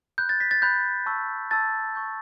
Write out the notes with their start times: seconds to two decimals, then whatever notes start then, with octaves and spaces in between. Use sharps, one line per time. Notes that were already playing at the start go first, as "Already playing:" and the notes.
0.18 B5 F#6 G6
0.29 A6
0.40 B6
0.51 A6
0.62 B5 F#6 G6
1.06 A5 C#6 E6
1.51 A5 C#6 E6 A6
1.95 C#6 G6